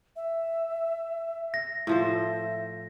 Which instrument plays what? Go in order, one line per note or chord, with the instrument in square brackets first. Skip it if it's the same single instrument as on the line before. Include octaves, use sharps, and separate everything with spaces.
[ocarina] E5
[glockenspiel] A#6
[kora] A2 F3 C5 [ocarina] E5